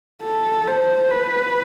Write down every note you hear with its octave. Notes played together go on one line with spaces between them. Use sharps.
A4
C5
B4